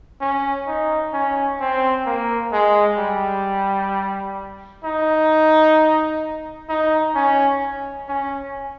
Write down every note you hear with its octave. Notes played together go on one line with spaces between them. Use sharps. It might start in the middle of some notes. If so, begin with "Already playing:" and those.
C#4
D#4
C#4
C4
A#3
G#3
G3
D#4
D#4
C#4
C#4